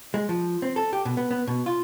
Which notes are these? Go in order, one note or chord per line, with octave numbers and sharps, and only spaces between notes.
G#3
F3
C4
A4
G4
B2
B3
B3
B2
F4